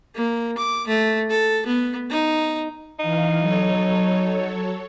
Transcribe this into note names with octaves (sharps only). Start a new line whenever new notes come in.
A#3
D6
A3
A4
B3
D#4
E3 D#4 F5
F#3 A4 C#5